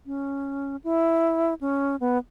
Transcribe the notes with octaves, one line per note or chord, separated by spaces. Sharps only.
C#4
E4
C#4
B3